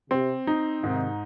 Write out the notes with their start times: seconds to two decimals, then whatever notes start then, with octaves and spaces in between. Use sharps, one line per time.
0.11 C3 C4
0.47 D#4
0.83 G#2 C3 D#3